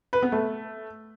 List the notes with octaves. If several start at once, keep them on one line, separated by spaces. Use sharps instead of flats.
B4
B3
A3